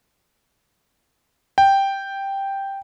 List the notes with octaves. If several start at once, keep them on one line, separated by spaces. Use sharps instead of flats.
G5